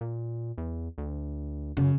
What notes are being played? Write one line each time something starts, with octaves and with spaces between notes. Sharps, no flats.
A#2
E2
D2
F#2 C#3